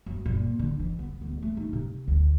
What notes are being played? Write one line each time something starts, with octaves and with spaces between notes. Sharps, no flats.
F#2
A#2
D3
E3
B3
D2
A3
D#4
C3
D2